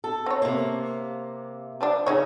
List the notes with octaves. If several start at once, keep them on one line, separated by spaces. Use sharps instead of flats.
A4
C4 C#5
C3 A#3
F3 G3 D4
C#3 D#4 G#4 C#5